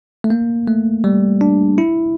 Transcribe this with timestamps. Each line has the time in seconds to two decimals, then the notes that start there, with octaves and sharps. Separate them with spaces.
0.24 A3
0.30 A#3
0.68 A3
1.04 G3
1.41 D4
1.78 E4